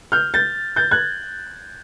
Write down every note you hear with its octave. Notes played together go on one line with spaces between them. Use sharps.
F6 G6
G6 A6
G6 A6
F#6 G#6